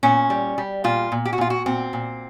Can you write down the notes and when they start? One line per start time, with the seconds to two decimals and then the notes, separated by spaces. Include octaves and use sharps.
0.03 A#2 C#4
0.30 G3
0.58 G3
0.84 A#2 F4
1.12 A#2
1.25 G4
1.33 F#4
1.38 A#2 F4
1.50 F#4
1.66 A#2 C4
1.93 A#2